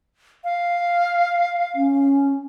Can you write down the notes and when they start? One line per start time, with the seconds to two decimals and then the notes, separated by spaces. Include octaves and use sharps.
0.44 F5
1.75 C#4